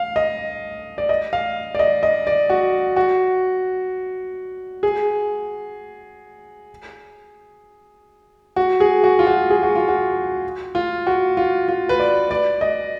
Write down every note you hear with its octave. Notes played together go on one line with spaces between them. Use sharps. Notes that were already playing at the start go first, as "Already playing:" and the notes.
Already playing: F5
D#5
D5
D#5
F5
D5
D#5
D#5
D5
F#4
F#4
G#4
F#4
G#4
F#4
F4
F#4
G#4
F#4
F4
F#4
F4
F#4
F4
F4
B4
D5
D5
D#5